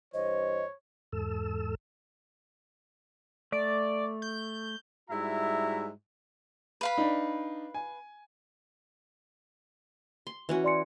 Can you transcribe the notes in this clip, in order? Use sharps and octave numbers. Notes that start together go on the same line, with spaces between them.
G2 E3 C5 C#5 D#5
E2 G#2 A4 E6
A3 D5
G6
G#2 G3 E4 F#4 E5 A#5
B4 F5 B5
D4 D#4
G#5
C6
E3 C#4 F#4
D5 C6 C#7